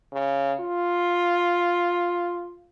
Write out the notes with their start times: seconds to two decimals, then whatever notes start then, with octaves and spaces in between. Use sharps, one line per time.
0.13 C#3
0.60 F4